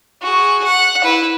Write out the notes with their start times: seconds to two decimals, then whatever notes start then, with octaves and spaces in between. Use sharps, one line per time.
0.22 F#4 G#4
0.64 F#5
1.04 E4 B4